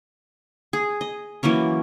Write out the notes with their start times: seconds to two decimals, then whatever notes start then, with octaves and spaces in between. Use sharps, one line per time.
0.73 G#4
1.01 D#5
1.43 E3 F#3 A#3 C#4